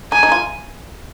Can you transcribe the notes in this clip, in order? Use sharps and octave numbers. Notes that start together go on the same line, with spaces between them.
D#4 G#5
D#4
F4